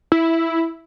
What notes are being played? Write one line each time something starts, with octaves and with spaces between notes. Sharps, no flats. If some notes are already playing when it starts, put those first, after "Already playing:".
E4